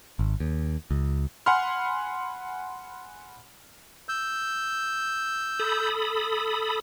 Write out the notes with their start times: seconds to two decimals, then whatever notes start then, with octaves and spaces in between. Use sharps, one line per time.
0.19 G#1
0.40 D#2
0.91 C#2
1.46 F#5 G#5 B5 C6 F6
4.09 E6 G6
5.60 A4 B5 D#6